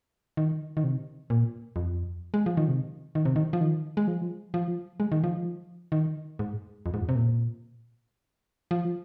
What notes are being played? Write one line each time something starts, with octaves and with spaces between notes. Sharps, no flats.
D#3
D#3
C3
A#2
F2
G#3
F3
D#3
C3
D#3
C3
D#3
F3
D#3
G#3
F3
F3
G#3
D#3
F3
D#3
G#2
F2
G#2
F2
C3
A#2
F3